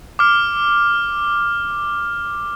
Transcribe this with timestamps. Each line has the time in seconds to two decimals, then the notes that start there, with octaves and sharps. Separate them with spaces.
0.19 D6 F6